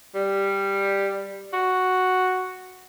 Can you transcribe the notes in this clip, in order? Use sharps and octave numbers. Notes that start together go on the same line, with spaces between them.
G3
F#4